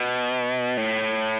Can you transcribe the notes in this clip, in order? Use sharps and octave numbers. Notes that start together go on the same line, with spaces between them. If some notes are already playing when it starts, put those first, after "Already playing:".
Already playing: B2
A2